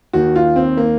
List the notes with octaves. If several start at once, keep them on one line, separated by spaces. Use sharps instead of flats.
D#2 D#3 F#4
F4
C4
A#3